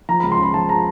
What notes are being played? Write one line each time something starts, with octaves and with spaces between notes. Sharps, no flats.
F3 A#5
B5
C#2
C6
C#3 B5
F3 A5
A#5